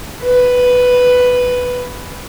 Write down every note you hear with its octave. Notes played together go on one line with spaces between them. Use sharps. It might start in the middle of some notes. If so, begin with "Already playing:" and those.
B4